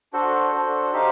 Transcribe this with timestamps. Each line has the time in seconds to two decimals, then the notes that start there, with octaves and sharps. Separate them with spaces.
0.13 D4 F#4 A4 C5
0.52 D4 F#4 A4 C5
0.93 D#4 G4 C5 F5